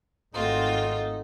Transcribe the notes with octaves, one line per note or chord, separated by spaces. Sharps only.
G#1 A3 C4 D#4 F4 F#4